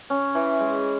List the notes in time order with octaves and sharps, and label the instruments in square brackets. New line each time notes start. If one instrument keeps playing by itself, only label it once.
[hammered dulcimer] C#4
E3
G#3